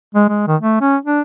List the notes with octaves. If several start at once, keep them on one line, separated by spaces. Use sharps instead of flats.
G#3
G#3
D#3
A3
C#4
D4